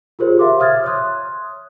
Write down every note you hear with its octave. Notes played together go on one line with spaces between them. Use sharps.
F4 G4 G#4 A#4 C5 C#5
E5 F5 C6 D6
E5 D#6 F6 G#6 A6
C#5 C6 D#6 F#6